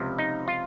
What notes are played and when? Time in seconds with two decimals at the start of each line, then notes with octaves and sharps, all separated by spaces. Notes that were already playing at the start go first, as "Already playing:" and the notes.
Already playing: C#2 C3 F3
0.18 D#4
0.48 F4